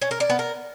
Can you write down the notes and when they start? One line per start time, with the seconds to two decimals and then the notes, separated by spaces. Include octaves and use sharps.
0.02 C#4
0.11 A#4
0.20 D5
0.30 B3
0.39 A#4